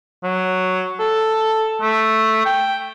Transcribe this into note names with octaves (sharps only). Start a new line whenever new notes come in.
F#3
A4
A3
G5